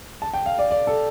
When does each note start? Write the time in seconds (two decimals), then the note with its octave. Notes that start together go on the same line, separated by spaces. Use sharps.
0.22 A5
0.34 G5
0.46 F5
0.59 D5
0.71 D5
0.87 A4